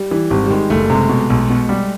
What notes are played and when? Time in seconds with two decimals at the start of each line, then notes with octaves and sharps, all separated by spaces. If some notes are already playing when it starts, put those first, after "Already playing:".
Already playing: G3
0.11 E3 G3
0.30 G#1 G3
0.44 G3
0.50 D#3 G#3
0.70 F#1 A3
0.90 C3 G#3
1.09 B2
1.30 B1
1.50 B2
1.69 G3